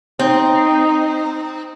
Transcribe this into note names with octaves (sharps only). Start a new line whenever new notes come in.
C4 D#4